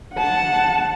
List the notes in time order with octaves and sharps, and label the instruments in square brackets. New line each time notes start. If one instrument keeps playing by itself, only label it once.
[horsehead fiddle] F#5 A5